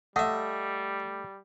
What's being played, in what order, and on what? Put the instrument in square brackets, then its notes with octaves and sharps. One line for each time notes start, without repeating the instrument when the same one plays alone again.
[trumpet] G3 [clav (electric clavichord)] A3 [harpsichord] D#5 E5 [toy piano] F#5